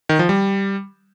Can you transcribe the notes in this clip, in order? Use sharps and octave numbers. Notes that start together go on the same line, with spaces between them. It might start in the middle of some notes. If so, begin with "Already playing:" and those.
D#3
F3
G3